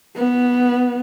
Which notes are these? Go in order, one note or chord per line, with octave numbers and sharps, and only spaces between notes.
B3